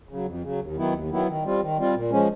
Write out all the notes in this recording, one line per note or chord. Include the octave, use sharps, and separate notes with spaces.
C#3 F#3
F2
C#3 F#3
D#2
D#3 F#3 B3 E4
D#2
D#3 F#3 B3 E4
D#3
G3 C4 F4
D#3
G3 C4 F4
A#2
F3 G#3 C#4